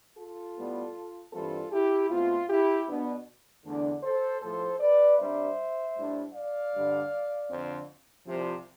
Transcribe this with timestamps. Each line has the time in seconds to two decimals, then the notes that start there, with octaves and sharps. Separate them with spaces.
0.18 F4 A4
0.57 A2 G3 B3
1.33 G2 E3 G3 C4 F4 A4
1.72 E4 G4
2.10 B2 A3 C4 F4
2.50 E4 G4
2.88 B2 B3 D4
3.64 E2 D3 A3 D4
4.03 A4 C5
4.42 A2 F3 A3 A4 C5
4.80 B4 D5
5.19 C3 G3 D4 C5 E5
5.97 A2 G3 D4
6.35 D5 F5
6.74 G2 D3 G3
7.50 F2 D3 F3 C4
8.27 C2 C3 F3